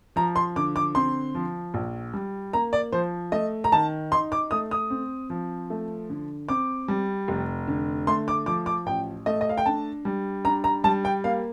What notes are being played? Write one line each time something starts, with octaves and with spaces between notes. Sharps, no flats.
F3 A#5
C6
D3 D6
D6
C4 C6
F3
A#1
G3
A#3 A#5
D5
F3 C5
A3 D#5
A#5
D#3 A5
D#4 C6
D6
A3 D#6
D#6
C4
F3
A3
D3
C4 D6
G3
F1
D3
A3 C6
D6
F3 D6
D6
A1 G5
A3 D#5
D#5
F5
G5
D4 A5
G3
D4 A#5
A#5
G3 A5
G5
A#3 F5